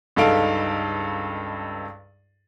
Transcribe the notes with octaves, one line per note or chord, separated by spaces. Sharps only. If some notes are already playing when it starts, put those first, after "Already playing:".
C#2 G2 D#4 A4 F5 D7